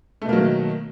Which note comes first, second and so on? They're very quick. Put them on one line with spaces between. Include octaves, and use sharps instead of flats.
A3 B2 A#3 F#3 D#3